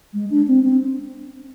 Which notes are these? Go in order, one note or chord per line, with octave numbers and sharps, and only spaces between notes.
G#3
D4
C4
C4